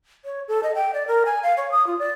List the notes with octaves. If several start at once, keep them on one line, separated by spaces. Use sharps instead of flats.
C#5
A4
D#5
G5
D5
A#4
G#5
F5
C#5
D#6
F4
D5